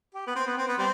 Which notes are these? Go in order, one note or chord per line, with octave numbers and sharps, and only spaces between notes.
G4
B3
C4
B3
C4
B3
G3 C4